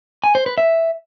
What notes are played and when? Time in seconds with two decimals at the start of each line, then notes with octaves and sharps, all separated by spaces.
0.24 G#5
0.35 C5
0.46 B4
0.58 E5